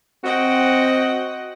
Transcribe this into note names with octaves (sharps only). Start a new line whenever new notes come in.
C4 F#4 D#5 F#5 G5